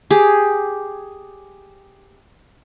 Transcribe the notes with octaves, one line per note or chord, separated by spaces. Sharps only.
G4 G#4